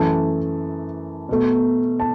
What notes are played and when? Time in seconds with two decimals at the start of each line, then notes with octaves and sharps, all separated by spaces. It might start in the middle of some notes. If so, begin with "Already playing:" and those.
Already playing: F#2 E3 A3 A5
1.29 B2 A3
2.00 A5